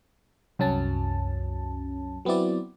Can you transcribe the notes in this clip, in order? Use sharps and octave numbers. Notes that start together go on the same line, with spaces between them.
C2 F#2 F#3 C#4 A5
F#3 B3 C4 E4 D5